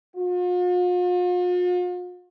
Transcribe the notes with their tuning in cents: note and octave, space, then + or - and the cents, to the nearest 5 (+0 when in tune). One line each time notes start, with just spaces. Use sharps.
F4 +45